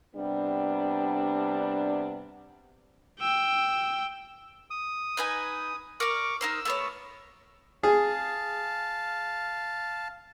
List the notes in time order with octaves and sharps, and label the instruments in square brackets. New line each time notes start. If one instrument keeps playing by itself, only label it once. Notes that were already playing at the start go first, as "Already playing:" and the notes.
[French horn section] C3 G3 B3 D4
[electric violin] G5 E6
[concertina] D#6
[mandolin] D#4 B4 G#5
[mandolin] A#4 D5 [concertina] C#6 D6
[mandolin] D#4 A#4 C5 [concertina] E6
[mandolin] A3 B3 C#5
[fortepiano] G#4 [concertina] F5 A5